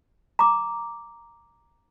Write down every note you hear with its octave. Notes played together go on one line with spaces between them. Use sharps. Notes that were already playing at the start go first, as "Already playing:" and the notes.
A#5 D6